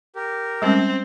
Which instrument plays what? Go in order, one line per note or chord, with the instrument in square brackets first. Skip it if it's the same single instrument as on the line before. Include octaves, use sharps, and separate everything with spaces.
[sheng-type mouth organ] G4 A#4
[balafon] G3 G#3 C#4 [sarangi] C4